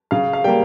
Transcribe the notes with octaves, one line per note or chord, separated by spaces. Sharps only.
C#3 F5
F5
G3 A#3 G5